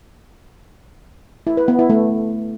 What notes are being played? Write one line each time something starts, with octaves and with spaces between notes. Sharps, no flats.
E4
B4
B3
E4
A3